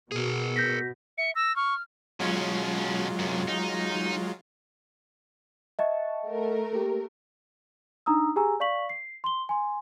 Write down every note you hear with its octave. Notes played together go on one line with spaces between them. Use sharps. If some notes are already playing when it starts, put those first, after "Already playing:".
B2 G#4 A#4
G6 A#6 B6
E5 C#7
E6 A#6
C#6 F6
B2 F#3 G#3 C#4 F4
F#2 C3
D#4
D#5 E5 F#5 A5 C#6
A3 A#4
A#3 G4
D4 D#4 A#5 D#6 E6
G4 G#4 G#5 A#5 E6
D5 F5 C#6 B6 F#7
C7
C6 G7
G#5 C6